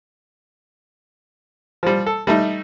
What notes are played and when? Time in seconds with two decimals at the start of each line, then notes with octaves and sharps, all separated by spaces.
1.83 F3 G3
2.06 A4
2.27 G3 A3 D#4